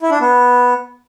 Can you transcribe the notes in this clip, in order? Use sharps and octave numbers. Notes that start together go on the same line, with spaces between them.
E4
D4
B3